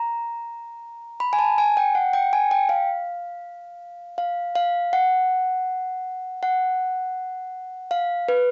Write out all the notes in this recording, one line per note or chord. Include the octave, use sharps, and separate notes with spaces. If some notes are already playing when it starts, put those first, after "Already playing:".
Already playing: A#5
B5
G#5
A5
G#5
G5
F#5
G5
G#5
G5
F5
F5
F5
F#5
F#5
F5
B4